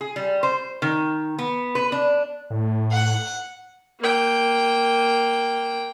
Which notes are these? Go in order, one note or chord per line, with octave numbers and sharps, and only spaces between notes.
G#4
G3
C5
D#3
B3
B4
D4
A2
F#5
A#3 G5